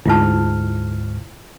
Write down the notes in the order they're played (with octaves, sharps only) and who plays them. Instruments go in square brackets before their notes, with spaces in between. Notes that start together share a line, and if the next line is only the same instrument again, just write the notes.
[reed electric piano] D2 G#2 F6 [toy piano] E4 F4 A5